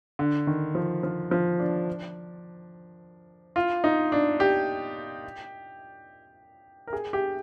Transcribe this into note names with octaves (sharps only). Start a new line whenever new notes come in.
D3
D#3
F3
F3
F3
D4
F4
D#4
D4
G4
A#4
G#4
G4